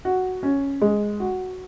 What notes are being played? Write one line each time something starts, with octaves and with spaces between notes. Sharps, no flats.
F#4
C#4
G#3
F#4